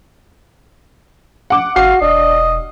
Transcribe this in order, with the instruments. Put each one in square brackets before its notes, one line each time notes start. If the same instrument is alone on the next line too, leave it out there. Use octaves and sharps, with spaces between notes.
[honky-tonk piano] F#5 D6
[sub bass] G1 [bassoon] F#4 [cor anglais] F5 [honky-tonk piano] C7
[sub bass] E1 [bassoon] D4 [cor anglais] D#5